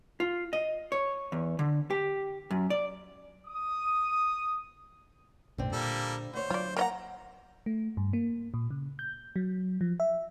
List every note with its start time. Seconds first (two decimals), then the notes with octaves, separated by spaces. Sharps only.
0.20 F4
0.53 D#5
0.92 C#5
1.32 E2
1.59 D3
1.90 G4
2.51 F#2
2.70 D5
3.47 D#6
5.58 B1 F#2 A2 D3 C4
5.73 A#2 G3 A#3 A4
6.33 D2 C5 C#5
6.50 F#3 F4 D5
6.77 A#3 D#5 F#5 A#5
7.66 A3
7.97 G2
8.13 A#3
8.54 A#2
8.71 C#3
8.99 G6
9.36 F#3
9.81 F3
10.00 E5